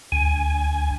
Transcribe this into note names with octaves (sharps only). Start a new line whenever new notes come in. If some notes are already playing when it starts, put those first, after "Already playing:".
D2 G#5